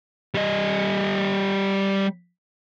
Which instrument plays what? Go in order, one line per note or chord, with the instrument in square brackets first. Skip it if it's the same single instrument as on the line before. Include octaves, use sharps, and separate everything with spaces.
[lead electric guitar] G3 D#5